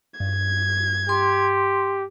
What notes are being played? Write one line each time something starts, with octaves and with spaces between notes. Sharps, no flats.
G2 G#6
G4 C6